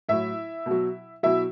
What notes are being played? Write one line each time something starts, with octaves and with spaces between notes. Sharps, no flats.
A2 F#3 E4 E5
B2 F#3
B2 F#3 E4 E5